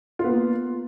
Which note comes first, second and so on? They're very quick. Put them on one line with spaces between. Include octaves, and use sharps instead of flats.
F4 B3 A#3